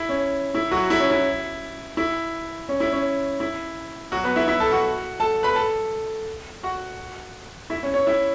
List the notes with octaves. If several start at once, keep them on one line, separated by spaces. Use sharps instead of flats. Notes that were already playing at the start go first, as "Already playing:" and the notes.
Already playing: E4
C#4
E4
F#3 F#4
E4
C#4
E4
E4
C#4
E4
C#4
E4
F#3 F#4
B3 B4
E4 E5
E4 E5
A4 A5
F#4 F#5
A4 A5
B4 B5
A4 A5
F#4 F#5
E4 E5
C#4
C#4 C#5
E4 E5